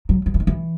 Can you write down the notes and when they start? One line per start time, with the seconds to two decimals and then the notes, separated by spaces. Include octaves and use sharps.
0.09 F#3
0.26 F#3
0.34 E3
0.40 D#3
0.47 E3